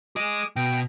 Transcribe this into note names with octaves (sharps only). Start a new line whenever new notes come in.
G#4 D#5 D6 D#6
B2 G5